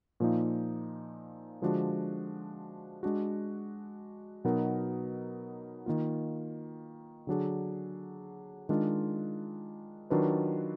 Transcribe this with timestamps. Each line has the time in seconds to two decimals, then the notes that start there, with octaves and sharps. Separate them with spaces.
0.20 A#2 F3 A#3 D#4
1.62 D3 F3 G#3 D4 F#4
3.03 G#3 D4 F#4
4.44 B2 F#3 B3 D#4 A#4
5.86 D#3 A#3 F4
7.27 D3 F#3 D4 G#4
8.69 D#3 G#3 D4 F4
10.10 D#3 F#3 D4 F4 B4